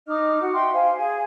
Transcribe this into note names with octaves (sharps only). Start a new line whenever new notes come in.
D#4 D#5 D6 F6
F#4
E5 G5 C6
C5 F5 G#5
G#4 G#5